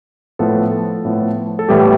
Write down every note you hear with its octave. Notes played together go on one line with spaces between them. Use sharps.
A2 F3 B3 A4
A2 F3 B3
A4
A2 E3 G3 B3 G4